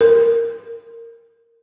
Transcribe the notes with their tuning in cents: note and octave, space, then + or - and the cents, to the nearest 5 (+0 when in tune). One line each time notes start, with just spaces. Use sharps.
A#4 -10